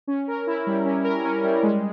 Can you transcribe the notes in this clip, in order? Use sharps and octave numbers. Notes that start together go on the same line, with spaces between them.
C#4
A#4
E4
G3
C#4
A#4
C#4
G3
G#3